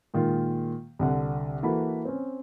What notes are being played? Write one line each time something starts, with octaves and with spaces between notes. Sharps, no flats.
A#2 D#3 G#3 F4
C2 D3 F#5
E3 A#3 F#4 A4 B5
C4 C#4